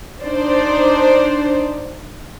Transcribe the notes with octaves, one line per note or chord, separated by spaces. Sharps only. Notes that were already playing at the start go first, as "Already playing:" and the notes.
D4 D#4 C5 D5